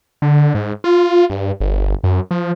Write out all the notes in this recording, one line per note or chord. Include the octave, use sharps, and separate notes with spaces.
D3
G#2
F4
G2
G1
F#2
F3